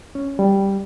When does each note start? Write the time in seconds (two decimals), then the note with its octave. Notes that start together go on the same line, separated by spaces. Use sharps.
0.15 C#4
0.39 G3